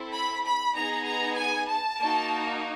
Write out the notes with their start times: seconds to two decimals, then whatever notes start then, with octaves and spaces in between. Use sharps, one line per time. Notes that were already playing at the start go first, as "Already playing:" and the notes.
Already playing: C4 E4 A4
0.14 B5
0.45 B5
0.75 B3 D#4 G#4 A#5
1.06 A#5
1.37 G#5
1.67 A5
1.98 A#3 D#4 F#4